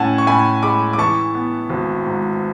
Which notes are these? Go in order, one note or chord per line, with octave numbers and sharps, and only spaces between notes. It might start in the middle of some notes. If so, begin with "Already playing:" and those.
Already playing: A2 C#4 F#5 G#5 A5
C#6
A2 G#5 B5
G#3 B5 D6
D6
E3 A5 C#6
B3
G#1
G#2